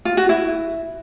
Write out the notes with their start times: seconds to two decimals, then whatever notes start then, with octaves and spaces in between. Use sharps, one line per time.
0.05 F4
0.17 F#4
0.29 E4